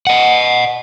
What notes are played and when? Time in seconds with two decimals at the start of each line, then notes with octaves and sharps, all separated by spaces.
0.07 D#5 F#5